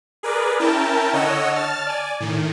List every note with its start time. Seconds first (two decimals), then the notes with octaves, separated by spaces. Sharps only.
0.23 G#4 A#4 B4 D5
0.59 C#4 E4 A#4 G5 A5
1.13 D3 C#5 D#5 F#5 E6
1.53 A5 F6 A6
1.86 D5 G#5
2.20 A2 D#3